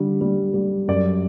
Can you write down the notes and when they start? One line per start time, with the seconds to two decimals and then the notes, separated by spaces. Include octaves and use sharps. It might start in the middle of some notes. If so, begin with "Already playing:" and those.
Already playing: D3 G3
0.21 G3
0.54 G3
0.88 F#2 D5